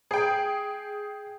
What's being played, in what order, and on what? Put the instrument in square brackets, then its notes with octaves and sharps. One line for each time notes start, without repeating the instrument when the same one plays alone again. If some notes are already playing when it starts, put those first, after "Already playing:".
[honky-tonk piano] G#4 G5